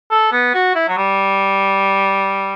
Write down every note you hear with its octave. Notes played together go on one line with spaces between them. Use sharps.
A4
B3
F#4
E4
F#3
G3